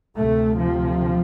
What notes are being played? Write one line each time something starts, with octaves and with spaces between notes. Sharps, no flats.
D2 C3 A3
F3